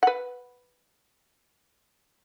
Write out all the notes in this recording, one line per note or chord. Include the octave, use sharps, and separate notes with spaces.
B4 F#5